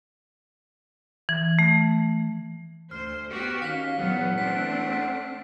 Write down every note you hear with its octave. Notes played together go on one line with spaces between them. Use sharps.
E3
A3
D2 C5 F6
B3 F#4 G4
D#3 C#4 F5 F6 B6 C#7
E2 A#2 F#3 B3 F#5
A3 C4 D4 B6
B6